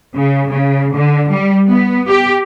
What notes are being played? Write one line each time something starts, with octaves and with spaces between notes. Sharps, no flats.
C#3
C#3
D3
G3
B3
G4